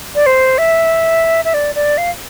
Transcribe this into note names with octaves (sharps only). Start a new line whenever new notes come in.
D5
C5
E5
E5
D5
D5
F5